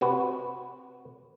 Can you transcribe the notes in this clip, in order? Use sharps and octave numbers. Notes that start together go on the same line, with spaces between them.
C3 F#4 B4